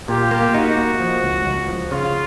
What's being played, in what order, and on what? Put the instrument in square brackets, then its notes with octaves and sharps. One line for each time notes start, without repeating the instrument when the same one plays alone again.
[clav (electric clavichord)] A#2 [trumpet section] F4 G4
[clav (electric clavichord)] A#3
[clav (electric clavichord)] D#4 [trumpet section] F#4
[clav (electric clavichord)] A#3
F3
C#2
C#2
F3
[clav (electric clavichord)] C#3 [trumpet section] F4